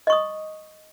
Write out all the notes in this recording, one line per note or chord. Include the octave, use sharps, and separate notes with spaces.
D#5 C#6 D#6